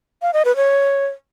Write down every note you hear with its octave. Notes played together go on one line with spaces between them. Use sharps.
F5
D#5
B4
C#5